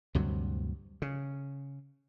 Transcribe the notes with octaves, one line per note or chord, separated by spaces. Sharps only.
D2 G2 C3 F#3
C#3